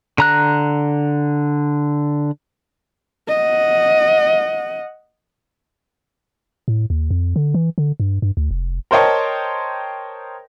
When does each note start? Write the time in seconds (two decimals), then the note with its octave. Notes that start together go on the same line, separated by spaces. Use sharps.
0.18 D3 A#5 F#6
3.28 D#5 F#5
6.68 A2
6.90 D#2
7.10 F2
7.36 D3
7.54 E3
7.78 D3
8.00 G2
8.22 G2
8.37 D2
8.51 F1
8.91 A#4 C5 C#5 D#5 G5 A5